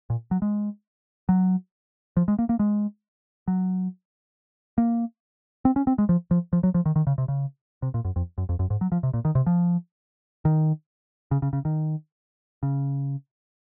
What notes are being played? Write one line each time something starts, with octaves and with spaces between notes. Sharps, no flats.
A#2
F#3
G#3
F#3
F3
G#3
A#3
A#3
G#3
F#3
A#3
C4
C#4
C4
G#3
F3
F3
F3
F#3
F3
D#3
D#3
C#3
C3
C#3
C3
A#2
F#2
F2
F#2
F2
F#2
G#2
F#3
F3
C3
A#2
D#3
C3
F3
D#3
C#3
C#3
C#3
D#3
C#3